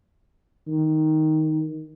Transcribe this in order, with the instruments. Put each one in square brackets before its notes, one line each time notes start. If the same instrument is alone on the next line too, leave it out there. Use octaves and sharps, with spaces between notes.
[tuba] D#3